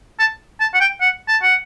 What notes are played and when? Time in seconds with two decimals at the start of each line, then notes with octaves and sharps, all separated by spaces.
0.19 A5
0.60 A5
0.74 F#5
0.81 G5
1.01 F#5
1.28 A5
1.43 F#5